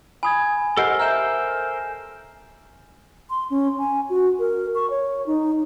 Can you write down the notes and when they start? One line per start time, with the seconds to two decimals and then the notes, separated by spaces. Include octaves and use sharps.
0.23 G#5 B5 D#6 G#6
0.77 G4 A4 A#4 C5 D#5 F#5
1.00 E5 A#5 F6 G6 E7
3.30 C6
3.50 C#4
3.79 G#5
4.10 F#4
4.39 A#4
4.75 C#6
4.90 C#5
5.26 D#4